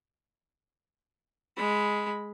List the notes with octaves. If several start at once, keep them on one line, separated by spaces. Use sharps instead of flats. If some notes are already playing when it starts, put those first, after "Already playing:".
G#3 B5